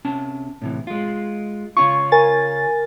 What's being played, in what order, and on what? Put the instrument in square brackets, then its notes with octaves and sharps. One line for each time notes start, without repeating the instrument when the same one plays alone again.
[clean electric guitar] C3 C#4 A5
A2 C3 E3
G#3 F4
[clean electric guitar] C#3 C#4 F4 [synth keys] C#6
[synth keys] A#4 G#5 A6